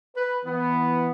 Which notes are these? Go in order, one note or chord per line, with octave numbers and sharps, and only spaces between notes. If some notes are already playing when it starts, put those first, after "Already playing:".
B4
E3 B3